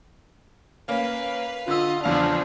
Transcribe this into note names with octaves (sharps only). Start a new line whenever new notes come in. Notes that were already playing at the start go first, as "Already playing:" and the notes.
A#3 C#4 B4 F5
D3 F4 D#5 E6
E2 C#3 E3 F3 D4 F5 F7